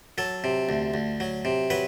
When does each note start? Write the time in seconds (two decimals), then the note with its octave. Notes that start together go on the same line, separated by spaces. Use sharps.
0.18 F#3 A4
0.44 C3
0.69 D2
0.94 D2
1.20 F#3
1.45 C3
1.70 F#3 B4